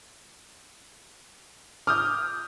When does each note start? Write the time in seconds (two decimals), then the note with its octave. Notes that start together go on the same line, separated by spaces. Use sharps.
1.87 D6 D#6 F6 G6